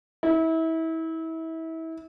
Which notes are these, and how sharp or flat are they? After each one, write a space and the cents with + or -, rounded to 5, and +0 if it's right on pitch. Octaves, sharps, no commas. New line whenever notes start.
E4 -30